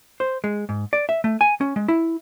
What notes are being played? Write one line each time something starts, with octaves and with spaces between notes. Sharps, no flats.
C5
G#3
G#2
D5
E5
A3
G#5
C#4
G#3
E4